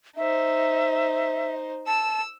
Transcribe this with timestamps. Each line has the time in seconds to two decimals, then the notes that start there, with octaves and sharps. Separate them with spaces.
0.17 D#4 C5 E5
1.87 A5 E6